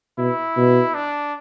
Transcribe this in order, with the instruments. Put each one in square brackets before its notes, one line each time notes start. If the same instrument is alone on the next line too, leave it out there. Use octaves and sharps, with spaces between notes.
[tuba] B2 [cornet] E4
[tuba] B2
[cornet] D4